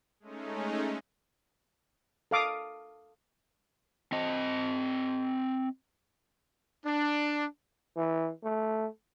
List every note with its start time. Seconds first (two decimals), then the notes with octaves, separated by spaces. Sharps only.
0.20 G#3 A3 C#4 D#4
2.31 A4 F5 D6 D#6
4.12 C4 D#5
6.85 D4
7.96 E3
8.43 A3